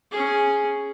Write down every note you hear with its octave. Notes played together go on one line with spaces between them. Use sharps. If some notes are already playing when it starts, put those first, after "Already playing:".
C#4 G#4